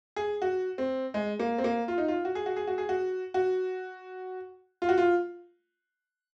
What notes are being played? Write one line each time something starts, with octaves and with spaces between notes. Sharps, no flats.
G#4
F#4
C4
G#3
A#3
C4
A#3
F4
D#4
F4
F#4
G#4
F#4
G#4
F#4
G#4
F#4
F#4
F4
F#4
F4